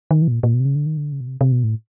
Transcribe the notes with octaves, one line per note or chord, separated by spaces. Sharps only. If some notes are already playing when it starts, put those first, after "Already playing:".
D#3
E3
B2
A#2
A#2
B2
C3
C#3
D3
D#3
D3
C#3
B2
C3
C3
B2
A2